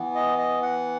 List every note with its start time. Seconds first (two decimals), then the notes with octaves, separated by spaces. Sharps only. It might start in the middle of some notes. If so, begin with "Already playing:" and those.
Already playing: E3 B3
0.15 D#5
0.38 D#5
0.63 F#5